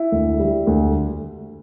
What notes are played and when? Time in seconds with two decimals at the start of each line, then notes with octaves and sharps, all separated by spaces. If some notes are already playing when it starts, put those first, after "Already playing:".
Already playing: E4
0.12 D2
0.39 G3
0.67 D2